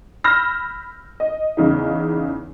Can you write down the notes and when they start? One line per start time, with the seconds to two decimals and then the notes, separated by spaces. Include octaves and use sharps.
0.24 B5 E6 F6 G6 A#6
1.20 D#5
1.57 E2 C#3 D#4